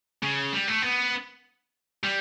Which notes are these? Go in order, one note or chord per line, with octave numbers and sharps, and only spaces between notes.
C#3
G3
A3
B3
G3